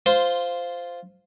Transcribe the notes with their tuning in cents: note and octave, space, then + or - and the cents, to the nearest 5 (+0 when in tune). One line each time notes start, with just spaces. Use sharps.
F4 +0 C5 -10